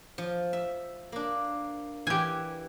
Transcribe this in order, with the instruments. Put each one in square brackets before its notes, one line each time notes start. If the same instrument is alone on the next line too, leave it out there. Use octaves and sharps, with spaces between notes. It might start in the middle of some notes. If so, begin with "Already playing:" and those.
[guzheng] F3
E5
A#3 D4
[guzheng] E3 [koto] G4 G#5